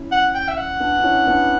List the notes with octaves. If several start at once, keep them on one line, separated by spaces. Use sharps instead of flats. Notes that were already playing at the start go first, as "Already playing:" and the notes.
Already playing: C#4 E4
F#5
G5
E5
F#5
B3 D4
D4
C#4 E4
B3 D4